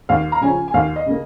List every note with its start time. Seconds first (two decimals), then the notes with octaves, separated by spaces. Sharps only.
0.09 D#2 F5
0.32 A#5
0.41 C#3 F3 C#4 G#5
0.68 G#5
0.74 D#2 F5
0.96 D#5
1.06 C#3 A#3